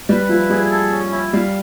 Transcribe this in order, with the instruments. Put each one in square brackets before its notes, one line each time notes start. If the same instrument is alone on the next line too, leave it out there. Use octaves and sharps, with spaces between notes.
[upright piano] G3 [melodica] B4
[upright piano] F3 [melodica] E4
[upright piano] G3 [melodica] G#4
[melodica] A4
C#4
E4
[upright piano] G3 [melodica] F5